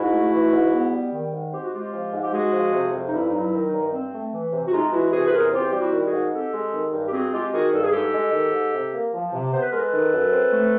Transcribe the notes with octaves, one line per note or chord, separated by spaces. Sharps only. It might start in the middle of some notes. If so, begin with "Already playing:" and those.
Already playing: G#2 E4 F#4
A3
E3
G#2
B3
G3
D#3
G#2
C4 G4
F#4
G#3 F4 G4
F3
G#2
G4
G#3 F#4 G#4
F3
C3
F2
D#4
G2 E4
F#3 D#4
E4
D#3
D#4
G2
C4
A3
E3
C3
F#4
G#3 D#4 F4
E3 E4 F#4
C3 F#4 G#4
B4
E2 G#4 A#4
C4 F4 G4
G3 G4
E4 F#4
D#3
F#4 G#4
G#2
C4 G4 A4
G#3
D#3
G2
G4
C4 F#4 G#4
G#3 F4 G4
D#3 F#4 G#4
G2 A4
G#4
G#2 G4 A4
G#3
D#3
G#2
C3
A#3
F3
C3
B3 C5
B4
G#3 A#4
A4 B4
D#3
F#2
C4
A3